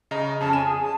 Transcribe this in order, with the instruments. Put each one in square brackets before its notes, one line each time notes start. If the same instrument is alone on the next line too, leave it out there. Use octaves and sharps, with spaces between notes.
[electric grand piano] C#3 D#5 A#5
[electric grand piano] F2 C#3 C#4 [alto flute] A5
[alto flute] G#5 [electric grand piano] E7
[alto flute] G#4
A5